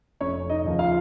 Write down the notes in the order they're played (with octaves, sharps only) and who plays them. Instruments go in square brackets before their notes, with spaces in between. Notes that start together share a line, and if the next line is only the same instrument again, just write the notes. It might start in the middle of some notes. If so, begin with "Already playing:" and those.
[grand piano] F1 C#4 C#5
D#4 D#5
D#2 C#3 F3 A#3
F4 F5